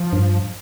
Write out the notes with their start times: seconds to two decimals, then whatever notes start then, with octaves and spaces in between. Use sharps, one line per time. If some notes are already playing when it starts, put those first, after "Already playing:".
Already playing: F3
0.13 G2